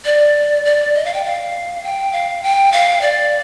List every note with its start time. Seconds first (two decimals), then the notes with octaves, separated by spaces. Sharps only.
0.05 D5
0.65 D5
0.95 D#5
1.05 F5
1.14 G5
1.25 F5
1.84 G5
2.13 F5
2.43 G5
2.72 F5
3.01 D5